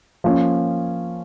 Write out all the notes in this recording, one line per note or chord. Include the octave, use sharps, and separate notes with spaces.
F3 A#3 C#4